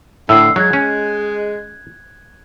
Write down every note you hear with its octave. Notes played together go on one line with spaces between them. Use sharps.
A2 D3 E6 C7
F#3 G#3 F#6 G#6
C#4